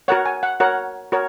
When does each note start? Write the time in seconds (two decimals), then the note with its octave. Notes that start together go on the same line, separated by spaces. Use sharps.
0.08 F#4 A#4 C#5 F#5
0.25 G#5
0.43 F#5
0.60 F#4 A#4 C#5 F#5
1.12 F#4 A#4 C#5